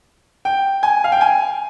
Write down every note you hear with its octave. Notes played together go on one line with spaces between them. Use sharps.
G5
G#5
F5
G5
G#5